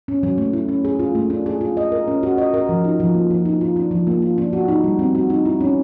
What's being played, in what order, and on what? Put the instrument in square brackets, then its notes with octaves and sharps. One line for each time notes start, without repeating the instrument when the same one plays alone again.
[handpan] C#4
F#3
A3
E4
C#4
G#4
F4
A3
D4
G#4
F4
D#5
A#4
C#4
F#4
D#5
A#4
F3
D#4
F3
A#3
F3
D#4
F4
D4
F3
A#3
F4
D4
F#4
D#4
G3
C4
F#4
D#4
E4
C#4